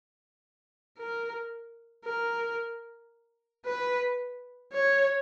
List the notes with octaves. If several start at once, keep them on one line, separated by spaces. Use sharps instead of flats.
A#4
A#4
B4
C#5